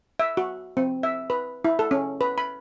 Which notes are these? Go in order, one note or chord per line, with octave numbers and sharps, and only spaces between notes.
E5
F#4
C4
E5
B4
E4
A4
C#4
B4
B5